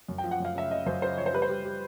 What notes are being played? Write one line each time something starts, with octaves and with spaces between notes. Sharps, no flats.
F#2
G5
F3
F#5
F#2 F5
C#3 E5
C#3 D#5
F#2 C5
C#3 C5
F3 C#5
C5
G3 B4
C5
G3
G3